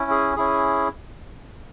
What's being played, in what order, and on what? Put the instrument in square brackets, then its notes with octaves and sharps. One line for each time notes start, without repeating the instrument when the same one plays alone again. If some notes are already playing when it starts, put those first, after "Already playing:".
Already playing: [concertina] C#4 E4
G#4
C#4 E4 G#4